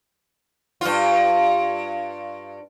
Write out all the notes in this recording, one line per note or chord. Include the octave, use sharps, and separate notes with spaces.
G2 F4